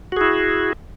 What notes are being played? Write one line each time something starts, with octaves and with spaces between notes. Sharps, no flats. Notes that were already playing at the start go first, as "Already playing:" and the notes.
E4 F#4 G#4